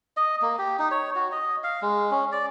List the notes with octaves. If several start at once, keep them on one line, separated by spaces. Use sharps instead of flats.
D#5
A#3
G4
D#4
C#5
F#4
D#5
F5
G#3
C#4
D5